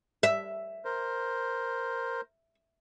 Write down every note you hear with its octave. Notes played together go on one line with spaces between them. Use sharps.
E5
A#4 C5